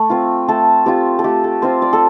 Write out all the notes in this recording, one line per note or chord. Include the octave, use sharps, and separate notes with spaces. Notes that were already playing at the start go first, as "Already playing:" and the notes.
Already playing: A3
C4 F4
A3 A4
C4 F4 G4
A4
A3 G4
A4
C4 F4 C5
D5
A4